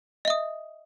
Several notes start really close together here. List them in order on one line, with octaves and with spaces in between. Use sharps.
D#5 E5 D#6